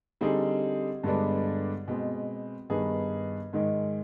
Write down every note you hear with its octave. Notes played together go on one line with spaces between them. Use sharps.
D3 G3 C4 D#4 G#4
G2 D3 G#3 B3 D4
B2 G#3 C4
G2 D#3 B3 D#4 G#4
G#2 D#3 G#3